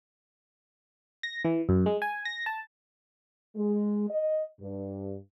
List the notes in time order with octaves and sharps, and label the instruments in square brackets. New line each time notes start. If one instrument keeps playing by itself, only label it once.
[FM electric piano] A#6
E3
F#2
G#3
G#5
A#6
A5
[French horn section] G#3
D#5
G2